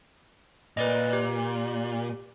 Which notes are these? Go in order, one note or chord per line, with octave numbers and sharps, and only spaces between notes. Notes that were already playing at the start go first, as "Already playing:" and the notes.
A#2 B4 D5 D#5
G4